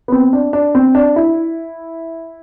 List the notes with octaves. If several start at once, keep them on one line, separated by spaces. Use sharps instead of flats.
B3
C4
D4
D4
C4
D4
E4